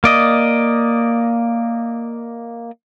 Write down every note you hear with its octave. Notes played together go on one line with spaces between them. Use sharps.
A#3 D5 D#5